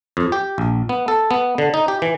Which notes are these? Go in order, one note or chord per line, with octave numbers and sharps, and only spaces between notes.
F2
G4
A#1
B3
A4
B3
D3
D#4
G4
E3